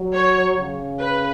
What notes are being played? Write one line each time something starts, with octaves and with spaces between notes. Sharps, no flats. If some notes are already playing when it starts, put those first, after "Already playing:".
Already playing: F#3
C#5
C#3
B4